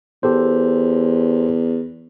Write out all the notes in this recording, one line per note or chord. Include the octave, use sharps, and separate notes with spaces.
E2 G4 A4 C5